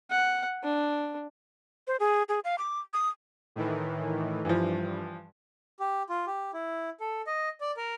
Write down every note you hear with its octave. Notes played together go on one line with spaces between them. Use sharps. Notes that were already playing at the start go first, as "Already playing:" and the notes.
F#5
D4
C5
G#4
G#4
F5
D6
D#6
A2 D#3 E3
G2 E3 F3
G4
F4
G4
E4
A4
D#5
D5
A#4